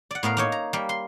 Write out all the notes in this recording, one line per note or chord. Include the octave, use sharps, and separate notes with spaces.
D5 F#5
A2 B3 A#4 F5
A#3 D#4 C#5
A#5
G3 A#3
C6